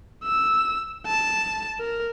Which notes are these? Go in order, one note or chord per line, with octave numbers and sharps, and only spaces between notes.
E6
A5
A#4